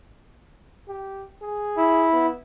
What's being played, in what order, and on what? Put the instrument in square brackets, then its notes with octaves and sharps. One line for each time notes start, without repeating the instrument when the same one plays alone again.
[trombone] G4
G#4
[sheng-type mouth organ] E4
[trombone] B3